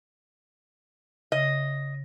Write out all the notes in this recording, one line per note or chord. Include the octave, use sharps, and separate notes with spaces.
C#3 D#5